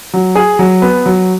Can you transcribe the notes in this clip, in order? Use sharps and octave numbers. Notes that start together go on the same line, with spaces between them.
F#3
G#4
F#3
B3
F#3